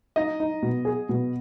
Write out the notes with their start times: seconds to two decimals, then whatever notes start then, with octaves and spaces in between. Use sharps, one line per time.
0.16 D#4 D#5
0.40 D#4
0.63 B2
0.85 G#4
1.09 B2